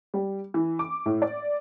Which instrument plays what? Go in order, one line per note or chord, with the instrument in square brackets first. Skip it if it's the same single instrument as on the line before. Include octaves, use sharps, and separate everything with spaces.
[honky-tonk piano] G3
E3
D6
A2
D5